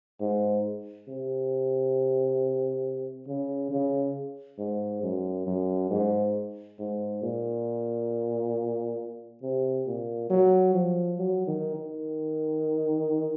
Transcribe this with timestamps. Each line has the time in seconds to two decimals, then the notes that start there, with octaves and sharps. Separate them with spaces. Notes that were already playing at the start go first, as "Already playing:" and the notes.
0.21 G#2
1.08 C3
3.28 C#3
3.71 C#3
4.59 G#2
5.03 F#2
5.47 F#2
5.91 G#2
6.79 G#2
7.23 A#2
9.43 C3
9.87 A#2
10.30 F#3
10.74 F3
11.18 F#3
11.47 D#3
11.76 D#3